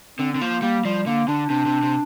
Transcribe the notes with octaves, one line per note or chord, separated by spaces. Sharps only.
D3 C4
D3 C4
F3 A#3
G3 A#3
F3 G3
D3 A#3
D3 D4
C3 D4
C3
C3